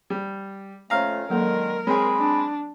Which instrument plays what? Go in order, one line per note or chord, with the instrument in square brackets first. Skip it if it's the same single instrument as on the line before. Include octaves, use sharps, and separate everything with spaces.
[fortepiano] G3
[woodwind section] F2 A3 [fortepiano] C#4 F5 A#5
[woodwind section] D3 D#3 G#3 [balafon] F#3 A#3 A4 [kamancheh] A#4
[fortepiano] G#3 C4 G#4 [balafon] C#5 [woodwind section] B5
[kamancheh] D4